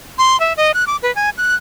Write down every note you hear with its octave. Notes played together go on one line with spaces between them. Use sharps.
C6
E5
D#5
F#6
D6
B4
G#5
F#6